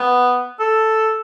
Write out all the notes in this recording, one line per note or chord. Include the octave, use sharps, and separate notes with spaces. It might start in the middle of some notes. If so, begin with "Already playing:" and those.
Already playing: B3
A4